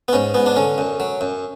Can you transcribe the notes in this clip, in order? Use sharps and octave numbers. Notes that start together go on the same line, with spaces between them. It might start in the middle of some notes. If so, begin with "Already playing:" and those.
B3
G#2 C#4
G#2 B3
D4
D3 C#4
F#2
F#3
F#2